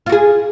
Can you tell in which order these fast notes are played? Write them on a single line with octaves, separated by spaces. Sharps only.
F4 F#4 G#4